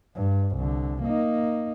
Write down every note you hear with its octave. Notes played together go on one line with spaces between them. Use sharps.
G2
C2 D3
A#3 D#4